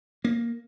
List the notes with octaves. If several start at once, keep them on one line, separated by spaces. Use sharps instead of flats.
A#3